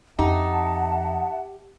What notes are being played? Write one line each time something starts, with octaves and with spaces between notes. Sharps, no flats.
F2 D#4 G4 E5 F#5 A5